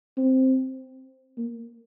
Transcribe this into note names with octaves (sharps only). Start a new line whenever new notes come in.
C4
A#3